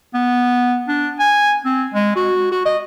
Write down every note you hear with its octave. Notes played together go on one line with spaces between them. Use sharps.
B3
D4
G#5
C4
G#3
F#4
F#4
D#5